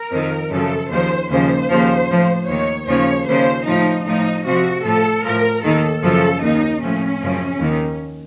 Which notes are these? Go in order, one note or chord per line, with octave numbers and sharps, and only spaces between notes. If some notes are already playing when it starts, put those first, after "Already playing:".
Already playing: A#4
F2 D#3
F#2 C#3 F3 A4
D#2 C#3 F3 C5
D#2 C#3 F3 C5
D#2 C#3 F3
A2 F3
D#2 D#3 C#5
D#2 C#3 F3 C#5
D#2 C#3 F3 C5
A2 F3 D#4
A2 F3 D#4
F2 C3 F3 F#4
A2 F3 A4
A2 F3 A#4
D#2 D#3 A4
F#2 C#3 F3 A4
D#2 D#3 D#4
A2 F3 C#4
F#2 C#3 F3
D#2 D#3